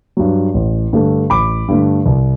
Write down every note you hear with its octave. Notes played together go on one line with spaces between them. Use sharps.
G2 F#3
A1
G2 D3 A3
A1 B5 D6
G2 D3 A3
C2